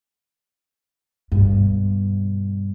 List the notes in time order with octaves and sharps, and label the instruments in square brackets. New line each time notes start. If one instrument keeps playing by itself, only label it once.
[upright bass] G2 B2